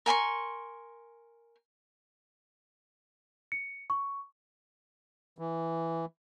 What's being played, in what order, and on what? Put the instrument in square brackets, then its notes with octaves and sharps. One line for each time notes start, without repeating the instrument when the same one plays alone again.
[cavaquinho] A#4 G#5 C6 C#6
[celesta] C#7
C#6
[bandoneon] E3